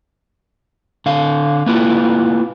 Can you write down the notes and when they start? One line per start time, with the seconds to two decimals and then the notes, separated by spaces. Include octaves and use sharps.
1.06 D3 F5
1.66 A#3 B3 E4 F4